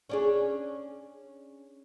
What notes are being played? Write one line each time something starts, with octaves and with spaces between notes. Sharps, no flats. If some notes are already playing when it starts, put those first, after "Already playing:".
C#4 D4 G#4